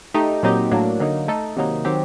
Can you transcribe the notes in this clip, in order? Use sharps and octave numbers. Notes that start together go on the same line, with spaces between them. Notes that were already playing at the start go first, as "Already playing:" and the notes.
A3 D#4 G4
A#2 F#3 C4 D#4 G4
A2 F#3 A#3 D4
D3 F#3 A#3 D#4
A3 D#4 A4
C3 D#3 F#3 A#3 D#4
D#3 F#3 C4 G4